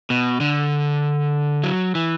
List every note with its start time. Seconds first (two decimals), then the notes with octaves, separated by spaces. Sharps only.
0.10 B2
0.40 D3
1.64 F#3
1.95 E3